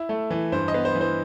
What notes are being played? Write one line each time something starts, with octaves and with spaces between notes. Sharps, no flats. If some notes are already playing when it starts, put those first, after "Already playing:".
Already playing: E4
A3
E3
G2 C5
D#5
B3
C5
E3
C5